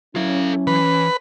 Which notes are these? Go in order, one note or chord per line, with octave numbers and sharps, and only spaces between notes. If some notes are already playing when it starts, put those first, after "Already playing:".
F#3 C#4 E4 A4 F5
E3 B4